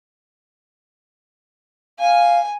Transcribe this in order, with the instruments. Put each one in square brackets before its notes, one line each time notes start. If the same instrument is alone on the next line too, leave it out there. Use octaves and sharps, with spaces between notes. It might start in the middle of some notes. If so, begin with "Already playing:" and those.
[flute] F5 [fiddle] G#5